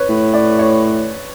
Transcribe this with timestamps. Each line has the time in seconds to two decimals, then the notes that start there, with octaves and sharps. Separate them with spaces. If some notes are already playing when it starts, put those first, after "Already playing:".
Already playing: B4 C#5
0.09 A2
0.34 D5
0.59 C#5